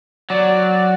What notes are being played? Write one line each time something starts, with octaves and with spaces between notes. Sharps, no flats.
F#3 D5